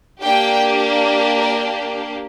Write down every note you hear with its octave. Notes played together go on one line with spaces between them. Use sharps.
A#3 D4 G4 G5
A#4